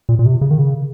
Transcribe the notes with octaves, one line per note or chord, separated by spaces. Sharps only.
A#2
A#2
C3
C#3
D#3
C#3